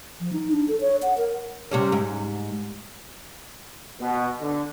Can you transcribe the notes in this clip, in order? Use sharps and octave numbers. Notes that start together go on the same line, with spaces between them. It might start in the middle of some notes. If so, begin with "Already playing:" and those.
F3
D#4
D4
A4
C#5
F#5
A#4
C3 G3 C#4
G#2
B2
D3